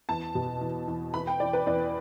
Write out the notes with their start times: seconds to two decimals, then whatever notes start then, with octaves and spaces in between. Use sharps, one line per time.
0.09 E2 A5
0.35 B2
0.61 E2
0.88 E2
1.14 E3 B5
1.27 G5
1.40 E3 D5
1.53 B4
1.67 E2 D5